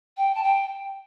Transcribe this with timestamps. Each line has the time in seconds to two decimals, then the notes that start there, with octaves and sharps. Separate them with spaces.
0.17 G5
0.35 A5
0.43 G5